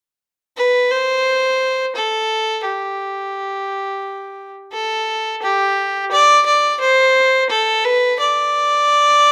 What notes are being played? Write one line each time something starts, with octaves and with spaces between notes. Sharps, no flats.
B4
C5
A4
G4
A4
G4
D5
D5
C5
A4
B4
D5